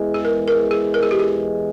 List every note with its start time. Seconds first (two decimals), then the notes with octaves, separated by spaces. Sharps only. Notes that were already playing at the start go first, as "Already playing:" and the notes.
Already playing: E2 E3 G#3
0.14 G#4
0.25 A#4
0.48 A#4
0.71 G#4
0.94 A#4
1.03 G#4
1.11 G4
1.20 G#4